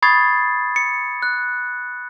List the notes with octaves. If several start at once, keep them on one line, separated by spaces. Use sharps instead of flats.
B5 C#6 D#6 G#6 A6 C7
C#7
F#6